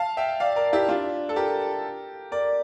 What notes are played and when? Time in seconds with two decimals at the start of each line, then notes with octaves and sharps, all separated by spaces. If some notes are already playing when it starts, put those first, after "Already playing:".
Already playing: F5 A5
0.17 E5 G5
0.40 D5 F5
0.56 A#4 D5
0.73 E4 G4
0.89 D4 F4
1.29 A4
1.36 G4 A#4
2.32 A#4 D5